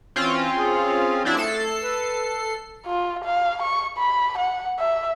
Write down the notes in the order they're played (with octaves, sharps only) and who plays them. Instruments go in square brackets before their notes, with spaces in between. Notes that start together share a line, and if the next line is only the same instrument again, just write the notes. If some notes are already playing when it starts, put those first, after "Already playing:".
[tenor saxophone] E3 [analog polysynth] C4 C#4 F4
[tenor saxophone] G#4
[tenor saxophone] F#3 [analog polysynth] C4 D4 E4
[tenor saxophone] A3 [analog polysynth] A4 C7
[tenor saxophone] B4
[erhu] F4
F5
C#6
B5
F#5
E5